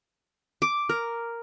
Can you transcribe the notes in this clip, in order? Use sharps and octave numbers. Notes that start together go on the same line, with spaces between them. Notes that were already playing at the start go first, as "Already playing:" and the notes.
D6
A#4